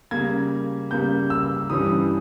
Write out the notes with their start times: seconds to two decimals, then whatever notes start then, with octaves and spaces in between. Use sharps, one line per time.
0.11 C#3 G3 A#3 G#6
0.91 C#3 G3 A#3 G6
1.30 E6
1.70 G2 E3 G3 C#4 D#6